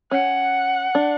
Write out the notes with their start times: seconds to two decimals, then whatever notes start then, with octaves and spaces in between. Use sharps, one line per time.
0.11 C#4 F#5
0.95 D4